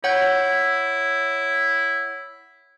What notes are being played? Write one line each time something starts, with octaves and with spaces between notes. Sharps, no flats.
E4 C#5 F#5 G6